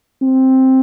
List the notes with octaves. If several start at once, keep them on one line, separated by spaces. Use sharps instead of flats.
C4